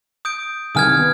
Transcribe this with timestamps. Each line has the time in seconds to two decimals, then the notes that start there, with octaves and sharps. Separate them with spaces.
0.25 D#6 G6 D7
0.75 C2 D#3 G#5 D#6 F6 G#6
0.97 B3